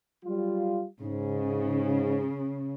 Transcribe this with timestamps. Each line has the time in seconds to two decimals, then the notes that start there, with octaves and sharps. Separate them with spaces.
0.25 F#3 G3 F4
1.01 G#2 C#3